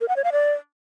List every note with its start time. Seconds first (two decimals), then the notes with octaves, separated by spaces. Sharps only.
0.01 A#4
0.08 F#5
0.16 C#5
0.24 F5
0.32 D5